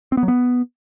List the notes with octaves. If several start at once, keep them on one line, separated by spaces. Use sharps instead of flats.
C4
B3
F#3
B3